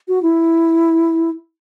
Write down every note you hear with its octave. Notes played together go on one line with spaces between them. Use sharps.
F#4
E4